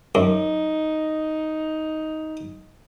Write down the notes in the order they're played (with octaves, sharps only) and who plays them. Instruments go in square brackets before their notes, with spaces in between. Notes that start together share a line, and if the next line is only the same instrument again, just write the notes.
[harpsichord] F#2 [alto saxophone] D#4